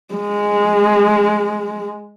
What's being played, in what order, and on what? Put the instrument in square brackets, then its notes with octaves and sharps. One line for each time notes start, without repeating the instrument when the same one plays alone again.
[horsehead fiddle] G#3